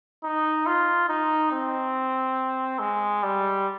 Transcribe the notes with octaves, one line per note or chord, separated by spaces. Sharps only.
D#4
F4
D#4
C4
G#3
G3